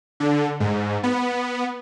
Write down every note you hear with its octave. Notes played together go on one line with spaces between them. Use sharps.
D3
G#2
B3